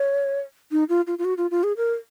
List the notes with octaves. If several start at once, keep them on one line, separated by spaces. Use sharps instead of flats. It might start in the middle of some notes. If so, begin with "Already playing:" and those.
Already playing: C#5
D#4
F4
F4
F4
F#4
F4
F4
G#4
A#4